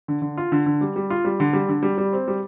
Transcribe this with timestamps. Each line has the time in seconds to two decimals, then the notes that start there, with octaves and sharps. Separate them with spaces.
0.08 D3
0.22 D3
0.38 F4
0.52 D3
0.66 D3
0.81 G3
0.96 G3
1.10 F4
1.25 G3
1.40 D3
1.53 G3
1.69 D3
1.83 G3
1.98 G3
2.13 C4
2.28 G3